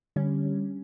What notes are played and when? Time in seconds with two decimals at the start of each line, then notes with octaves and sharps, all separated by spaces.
0.16 D3 G3 C#4